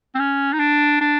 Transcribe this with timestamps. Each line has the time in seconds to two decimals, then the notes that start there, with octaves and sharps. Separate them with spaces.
0.15 C4
0.19 C#4
0.53 D#4
0.60 D4
1.01 D4